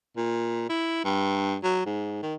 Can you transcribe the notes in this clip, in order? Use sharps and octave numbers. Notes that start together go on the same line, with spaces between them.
A#2
E4
G2
F#3
G#2
D#3